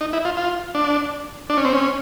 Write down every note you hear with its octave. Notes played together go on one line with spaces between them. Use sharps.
D#4
E4
F4
F4
D4
D4
C#4
C4
C#4